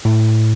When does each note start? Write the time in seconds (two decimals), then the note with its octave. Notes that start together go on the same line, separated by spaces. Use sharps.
0.05 A2